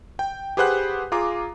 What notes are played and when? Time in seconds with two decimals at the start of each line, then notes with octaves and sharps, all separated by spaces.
0.19 G5
0.57 G4 G#4 B4 C5 F#5 F#6
1.12 F4 G#4 A#5 D6